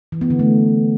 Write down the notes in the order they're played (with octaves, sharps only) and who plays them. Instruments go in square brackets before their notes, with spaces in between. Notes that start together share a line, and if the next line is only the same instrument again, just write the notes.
[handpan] E3
B3
D3
A3